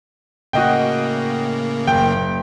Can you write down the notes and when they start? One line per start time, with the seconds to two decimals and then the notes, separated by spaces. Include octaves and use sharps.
0.53 A2 C#3 A#3 F#4 D#5 G5
1.87 F#1 G5